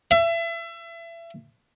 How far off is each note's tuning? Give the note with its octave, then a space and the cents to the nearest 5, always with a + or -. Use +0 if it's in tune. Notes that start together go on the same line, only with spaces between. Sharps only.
E5 +30